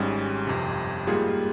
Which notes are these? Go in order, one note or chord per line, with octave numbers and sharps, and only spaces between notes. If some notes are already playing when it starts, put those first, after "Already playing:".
Already playing: G#1 G#2 G3 C#4
G1 F2 C3
G#2 G3 A#3 F4 G#4